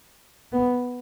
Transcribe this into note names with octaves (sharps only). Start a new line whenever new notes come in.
B3